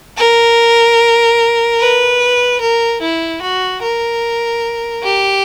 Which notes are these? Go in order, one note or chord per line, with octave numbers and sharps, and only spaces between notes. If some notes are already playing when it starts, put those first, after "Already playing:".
A#4
B4
A#4
E4
F#4
A#4
G4